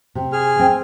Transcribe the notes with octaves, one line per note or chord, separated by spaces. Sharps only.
C3
G#4 F6
C4 G5